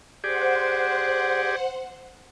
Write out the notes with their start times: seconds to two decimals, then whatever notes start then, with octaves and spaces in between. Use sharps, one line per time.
0.24 G4 G#4 C5 D5 F#5